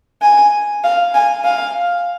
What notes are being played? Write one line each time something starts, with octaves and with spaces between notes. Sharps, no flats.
G#5
F5
G#5
F5